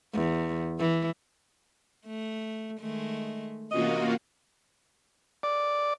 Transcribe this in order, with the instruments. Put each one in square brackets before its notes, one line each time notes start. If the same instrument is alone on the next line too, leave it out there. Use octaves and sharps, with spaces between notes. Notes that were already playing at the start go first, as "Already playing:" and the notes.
[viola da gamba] E2
E3
A3
D#3 G#3 A3
[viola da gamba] C3 E3 C#4 [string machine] A#3 F4 F#4 [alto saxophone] D#5
[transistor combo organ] D5